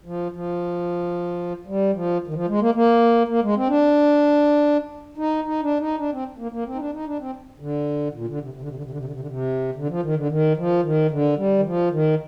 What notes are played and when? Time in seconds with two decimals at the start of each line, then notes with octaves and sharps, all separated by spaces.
0.06 F3
0.32 F3
1.67 G3
1.94 F3
2.27 D#3
2.34 F3
2.48 G#3
2.60 A#3
2.74 A#3
3.28 A#3
3.43 G#3
3.56 C4
3.68 D4
5.18 D#4
5.45 D#4
5.62 D4
5.80 D#4
5.99 D4
6.12 C4
6.38 A#3
6.52 A#3
6.66 C4
6.75 D#4
6.79 D4
6.93 D#4
7.05 D4
7.19 C4
7.60 D3
8.14 A#2
8.27 D3
8.41 C3
8.54 C3
8.61 D3
8.68 C3
8.75 D3
8.84 C3
8.91 D3
8.98 C3
9.05 D3
9.13 C3
9.20 D3
9.27 C3
9.75 D3
9.89 F3
10.03 D#3
10.16 D3
10.29 D#3
10.57 F3
10.83 D#3
11.10 D3
11.37 G3
11.59 D#3
11.65 F3
11.91 D#3